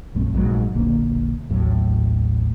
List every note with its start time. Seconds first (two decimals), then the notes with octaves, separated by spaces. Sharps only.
0.15 A#1 F#2 A3 C4
0.34 A#1 G#2 C3 F#3
0.75 E1 A#1 D3 A#3
1.50 A1 D#2 A2 F#3